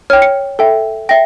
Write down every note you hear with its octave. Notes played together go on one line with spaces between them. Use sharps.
C#5 G5 F6
C#7
A4 E5 G5
E5 G5 A#6